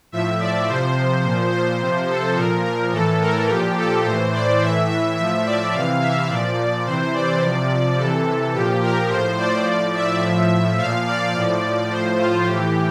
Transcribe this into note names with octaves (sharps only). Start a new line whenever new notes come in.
A2 F3 E5
D5
C3 F3 C5
A#2 F3
C5
C3 F3
A4
A#2 F3 A#4
A#4
A2 E3 A4
A#4
A#2 F3 G4
A4
A2 E3 C5
D5
A2 E3 E5
E5
A2 F3 E5
D5
C3 E3 F5
E5
A#2 F3 D5
C3 E3 C5
D5
C3 F3
C3 E3 A4
A#2 F3 G4
A#4
A2 F3 C5
D5
A2 F3
E5
A2 F3
A#2 F3 F5
D5
A2 F3 D5
A2 F3 C5
F4
A2 E3 G4